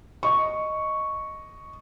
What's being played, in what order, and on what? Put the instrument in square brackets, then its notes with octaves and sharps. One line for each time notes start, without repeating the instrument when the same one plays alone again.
[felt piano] D#5 C#6